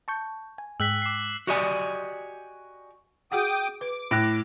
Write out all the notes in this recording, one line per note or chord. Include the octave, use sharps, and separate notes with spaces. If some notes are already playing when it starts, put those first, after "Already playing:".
A5 C#6 G6
G#5
G#2 G#3 G5 E6 F#6 B6
D6 C7
F#4 G4 D5 D#5 F#5 G#5
F#4 G#4 F#5 G5 D6 D#6
B4 D6
A2 F#6 A#6 D7